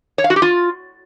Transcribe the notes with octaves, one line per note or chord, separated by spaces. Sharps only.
C#5
F5
F#4
G4
F4